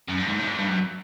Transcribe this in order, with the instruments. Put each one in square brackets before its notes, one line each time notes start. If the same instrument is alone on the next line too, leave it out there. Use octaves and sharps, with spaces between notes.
[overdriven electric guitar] F#2
G2
G#2
A2
G#2
G2
F#2